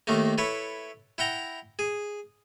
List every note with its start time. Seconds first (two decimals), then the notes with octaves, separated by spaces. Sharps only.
0.07 D#2 D#3 A3 A#3
0.38 E4 A4 B4 C#5
1.18 E4 F#5 G5 A#5
1.79 G#4